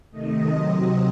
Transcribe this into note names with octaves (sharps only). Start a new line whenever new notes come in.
C3 D#3 A3 D#5
C3 F#3 C4